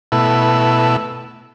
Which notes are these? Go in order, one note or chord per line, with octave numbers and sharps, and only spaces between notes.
B2 A3 E4